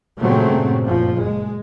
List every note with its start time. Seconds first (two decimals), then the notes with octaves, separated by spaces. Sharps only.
0.20 G2 A#2 C#3 F#3 A3 C4
0.83 F#1 A#2 F3
1.21 G#3